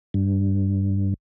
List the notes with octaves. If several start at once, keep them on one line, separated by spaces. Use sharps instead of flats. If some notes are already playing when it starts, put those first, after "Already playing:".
G2